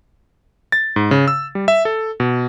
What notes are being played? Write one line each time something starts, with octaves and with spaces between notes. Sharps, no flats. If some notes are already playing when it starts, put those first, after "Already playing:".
A6
G#2
C#3
E6
G3
E5
A4
B2